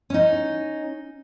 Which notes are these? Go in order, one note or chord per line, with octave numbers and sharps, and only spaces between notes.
C#4 D#4